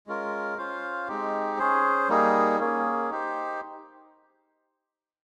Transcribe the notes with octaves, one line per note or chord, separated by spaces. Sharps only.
G#3 C#4 F4 A#4
C#4 F4 C5 F5
G#3 C4 D#4 G4
C#4 G#4 C5
G3 A#3 D#4 G#4
A#3 C#4 G#4
D#4 G4 C5